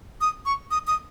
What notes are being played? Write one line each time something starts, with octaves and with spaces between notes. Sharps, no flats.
D#6
C#6
D#6
D#6